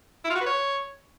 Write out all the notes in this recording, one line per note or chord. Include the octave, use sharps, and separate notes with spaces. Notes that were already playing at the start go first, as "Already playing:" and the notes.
E4
F4
F#4
B4
C#5